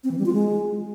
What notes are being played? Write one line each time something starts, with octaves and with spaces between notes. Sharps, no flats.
C4
E3
G3
F4
G#3